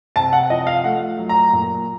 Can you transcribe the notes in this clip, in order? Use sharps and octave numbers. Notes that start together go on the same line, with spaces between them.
C3 A5
F#5
F3 D#5
F5
A3 F#5
F#3
A#5
A#2